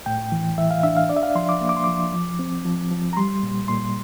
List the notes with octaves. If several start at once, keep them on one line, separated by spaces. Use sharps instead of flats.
A2 G5
E3
E3 E5
F5
D4 E5
F5
D4 D5
E5
F5
F3 C6
D6
A#3
D6
C6
F3 D6
F3
C4
F3
F3
A#5
G3 C6
A#2
A#2 C6